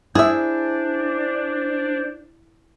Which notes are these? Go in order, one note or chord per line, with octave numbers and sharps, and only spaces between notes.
D4 E4 G#4 C5 E5